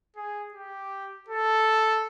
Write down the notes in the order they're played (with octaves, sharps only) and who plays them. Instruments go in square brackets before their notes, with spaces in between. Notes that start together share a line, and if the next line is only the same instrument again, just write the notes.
[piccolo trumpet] G#4
G4
A4